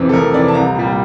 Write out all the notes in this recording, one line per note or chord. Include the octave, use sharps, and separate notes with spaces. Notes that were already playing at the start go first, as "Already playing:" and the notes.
Already playing: F2 C3 E3
A4
F2 A#4
C3 E3 D5
A5
C2 A#5
A#2 G3